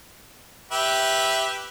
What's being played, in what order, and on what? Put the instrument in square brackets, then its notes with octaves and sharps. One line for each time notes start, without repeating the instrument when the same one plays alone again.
[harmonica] G4 B4 E5